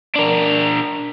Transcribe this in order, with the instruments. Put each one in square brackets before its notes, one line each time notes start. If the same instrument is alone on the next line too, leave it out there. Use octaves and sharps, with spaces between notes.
[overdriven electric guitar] D4 A#4